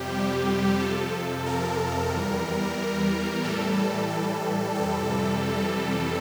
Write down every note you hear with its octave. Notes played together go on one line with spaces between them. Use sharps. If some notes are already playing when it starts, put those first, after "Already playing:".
Already playing: F2 C3 G3 G4
F2 C3 F3 A4
A#4
E2 E3 G3
A2 E3 G3 A4
A4
F2 C3 E3 G3 A4